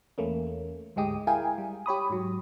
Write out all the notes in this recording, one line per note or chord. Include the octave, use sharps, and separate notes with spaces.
E2 A3 A#3 C#4
D2 G#2 G#3 G4 D#6
E4 G#4 A#4 F5 G5 G#5
G3
G4 C#5 B5 D#6
G#2 F#3